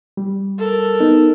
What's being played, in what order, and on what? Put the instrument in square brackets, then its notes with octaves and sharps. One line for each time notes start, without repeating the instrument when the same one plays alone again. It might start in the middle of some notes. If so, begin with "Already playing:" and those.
[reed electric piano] G3
[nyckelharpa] A4 A#4
[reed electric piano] B3 D#4